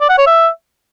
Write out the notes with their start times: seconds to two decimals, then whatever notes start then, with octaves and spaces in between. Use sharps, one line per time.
0.01 D5
0.10 F#5
0.18 C#5
0.26 E5